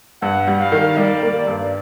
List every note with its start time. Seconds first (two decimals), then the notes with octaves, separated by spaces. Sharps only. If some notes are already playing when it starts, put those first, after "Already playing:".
0.21 G2 F#5
0.48 G3
0.59 F5
0.72 D#3
0.97 G3 D5 D#5
1.23 A#3
1.47 G2